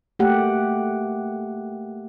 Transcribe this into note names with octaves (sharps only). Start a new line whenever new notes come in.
A3 A#3 G4 F#5